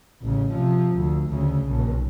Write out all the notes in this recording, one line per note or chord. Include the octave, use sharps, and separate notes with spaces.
A1 C#3
C3 F3
D2
D2 C#3
B1